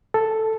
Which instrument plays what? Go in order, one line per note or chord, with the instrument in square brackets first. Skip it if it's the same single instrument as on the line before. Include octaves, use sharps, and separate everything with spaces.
[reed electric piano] A4